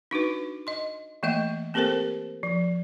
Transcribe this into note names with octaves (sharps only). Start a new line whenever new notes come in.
D4 D#4 F#4 B4
D#5 C6
E3 A3 A#3 D#5 E5
A#3 C4 G4 A4 A#4 C5
F3